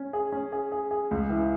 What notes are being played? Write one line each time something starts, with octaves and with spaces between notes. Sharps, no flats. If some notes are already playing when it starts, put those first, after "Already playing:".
Already playing: C#4
G#4
C#4
G#4
G#4
G#4
C#2
E3